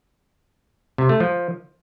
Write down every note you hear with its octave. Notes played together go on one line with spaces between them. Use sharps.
C3
A3
F3